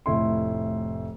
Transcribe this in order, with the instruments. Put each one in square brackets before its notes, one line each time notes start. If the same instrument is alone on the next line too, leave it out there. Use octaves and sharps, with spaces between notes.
[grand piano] F1 A2 E4 A4 C6